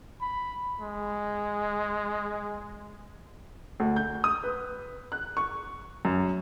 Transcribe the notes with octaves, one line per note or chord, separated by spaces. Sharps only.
B5
G#3
D2
G6
D#6
B4
F#6
C#6
F#2